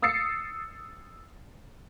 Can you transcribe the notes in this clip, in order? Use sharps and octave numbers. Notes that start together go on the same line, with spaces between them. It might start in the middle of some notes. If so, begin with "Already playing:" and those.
D#6 E6 A6 C7 C#7